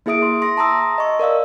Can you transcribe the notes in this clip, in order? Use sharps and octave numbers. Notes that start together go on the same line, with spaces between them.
A#3 E4 G#4 E5 D#6 D7
C6
C6 A#6
A5 A#5 C6 D#6 E6 A#6
D#5 C#6
A#4 D5 F5 E6